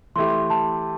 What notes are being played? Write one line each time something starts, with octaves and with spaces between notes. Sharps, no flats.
E3 A3 E4 G4 C6
A5